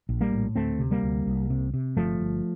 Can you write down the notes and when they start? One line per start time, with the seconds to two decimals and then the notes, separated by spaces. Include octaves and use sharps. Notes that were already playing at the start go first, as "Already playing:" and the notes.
0.09 A#1
0.21 G3 A#3
0.32 A2
0.56 D2 A3 C4
0.79 C3
0.91 G3 A#3
1.03 D2
1.26 C2
1.50 C3
1.74 C3
1.96 G1 F3 A3
2.20 G1